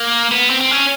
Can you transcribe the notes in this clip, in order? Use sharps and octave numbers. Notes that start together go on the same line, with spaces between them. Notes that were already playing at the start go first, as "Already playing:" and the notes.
Already playing: A#3
B3
C4
C4
C#4